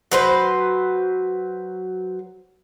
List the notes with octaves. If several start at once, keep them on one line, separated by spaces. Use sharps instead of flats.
F#3 B4 C5